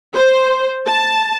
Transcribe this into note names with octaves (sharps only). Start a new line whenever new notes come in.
C5
A5